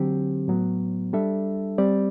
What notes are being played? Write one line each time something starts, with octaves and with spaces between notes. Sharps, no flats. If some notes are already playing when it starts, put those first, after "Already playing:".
Already playing: D3 F#3 C4 G4
A2 F#3 B3
G3 D4 A4 E5
G3 C4 G4 D5